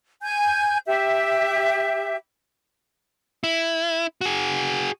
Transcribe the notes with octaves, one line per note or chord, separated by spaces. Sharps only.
G#5 G6
G4 E5
E4
F#4 G#4